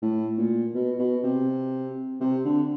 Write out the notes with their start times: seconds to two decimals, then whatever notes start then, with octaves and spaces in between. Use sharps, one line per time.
0.02 A2
0.38 A#2
0.75 B2
0.99 B2
1.24 C3
2.21 C3
2.45 D3